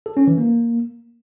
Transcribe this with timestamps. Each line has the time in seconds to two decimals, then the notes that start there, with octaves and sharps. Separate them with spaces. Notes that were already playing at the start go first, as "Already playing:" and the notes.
0.06 A4
0.17 C#4
0.27 E3
0.38 A#3